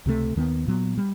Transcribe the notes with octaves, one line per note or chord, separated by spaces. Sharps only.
C#2 C3 E3 A3
D#2 D#3 G#3 B3
A#2 F#3 B3
G3